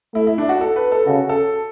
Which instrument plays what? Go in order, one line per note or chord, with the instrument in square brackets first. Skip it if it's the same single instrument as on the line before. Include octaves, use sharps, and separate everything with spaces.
[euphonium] A3 [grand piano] E4
[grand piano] E4
D4
F#4
A4
B4
A4
[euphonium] C#3 [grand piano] F#4
[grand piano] A4